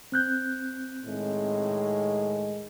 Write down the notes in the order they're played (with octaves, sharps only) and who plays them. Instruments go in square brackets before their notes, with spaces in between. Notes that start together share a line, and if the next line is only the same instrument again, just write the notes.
[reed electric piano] C4 F#6 G6
[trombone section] A2 D#3 G#3